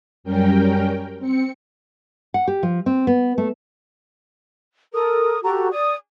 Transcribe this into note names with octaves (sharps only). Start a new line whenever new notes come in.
F#2 G3 C#4 A#4 G5
C4 C#7
F#5
G4
F3
C4
B3
A3
A4 A#4 D#6
F#4 G4 A4 A#5
D5 D#6